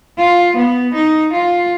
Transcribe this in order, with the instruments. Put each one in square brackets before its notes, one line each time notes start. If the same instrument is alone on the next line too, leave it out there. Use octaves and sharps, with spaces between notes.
[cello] F4
B3
D#4
F4